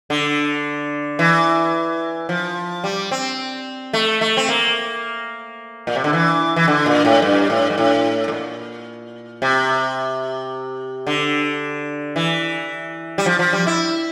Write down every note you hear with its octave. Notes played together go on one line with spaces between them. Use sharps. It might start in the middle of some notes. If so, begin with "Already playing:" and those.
D3
E3
F3
G3
C4
A3
A3
C4
A#3
A#2
C3
D3
E3
E3
D3
A#2
A2
G2
A2
G2
A2
A2
A#2
C3
D3
E3
G3
F3
F3
G3
E4